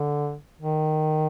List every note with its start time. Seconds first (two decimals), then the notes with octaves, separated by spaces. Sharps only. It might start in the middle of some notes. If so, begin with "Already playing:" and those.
Already playing: D3
0.61 D#3